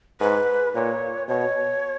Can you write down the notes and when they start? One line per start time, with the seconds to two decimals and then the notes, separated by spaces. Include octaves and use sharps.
0.20 G#2 B4
0.74 A#2 C#5
1.28 B2 C#5